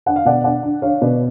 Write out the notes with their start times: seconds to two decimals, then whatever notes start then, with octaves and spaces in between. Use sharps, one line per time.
0.06 D4 F#5
0.16 F5
0.25 B2 D5 F#5
0.44 D4 D5 F#5
0.63 D4
0.82 D4 C#5 F5
1.02 B2 B4 D5